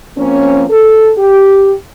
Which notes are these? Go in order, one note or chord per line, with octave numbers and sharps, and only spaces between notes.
F3 A#3 C4 C#4
A4
G4